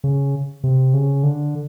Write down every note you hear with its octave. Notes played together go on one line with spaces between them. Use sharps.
C#3
C3
C#3
D3